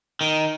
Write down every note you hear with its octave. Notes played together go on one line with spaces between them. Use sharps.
D#3